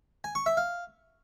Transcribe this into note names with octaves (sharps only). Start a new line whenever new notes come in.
G#5
C#6
E5
F5